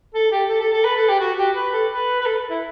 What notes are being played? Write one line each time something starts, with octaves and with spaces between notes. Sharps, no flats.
A4
G4
A4
A4
A4
B4
A4
G4
F#4
G4
B4
A4
B4
B4
A4
E4